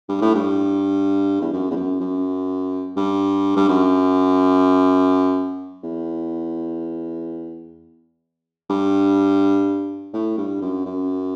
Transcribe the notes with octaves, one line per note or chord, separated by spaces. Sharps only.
G2
A2
G2
E2
F#2
E2
F#2
F#2
G2
G2
F#2
E2
G2
A2
G2
F#2
F#2